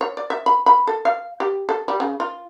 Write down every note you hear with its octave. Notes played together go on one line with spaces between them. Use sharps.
C#5
D5
E5
B5
B5
A4
F5
G4
A4
G3
C#3
F4